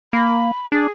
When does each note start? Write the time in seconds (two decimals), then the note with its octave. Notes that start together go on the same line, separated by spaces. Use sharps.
0.13 A#3 B5
0.72 D4 G#4